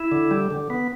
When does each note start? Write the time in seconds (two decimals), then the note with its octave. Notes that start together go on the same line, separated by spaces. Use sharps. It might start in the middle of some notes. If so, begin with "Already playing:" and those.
Already playing: E4
0.12 D3
0.31 G3
0.51 D3
0.70 B3